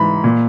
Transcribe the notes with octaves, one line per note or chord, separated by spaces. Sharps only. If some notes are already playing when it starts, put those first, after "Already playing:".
Already playing: G#2 E3 B5
A#2